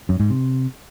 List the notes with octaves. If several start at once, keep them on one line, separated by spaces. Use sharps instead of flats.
F#2
G#2
C3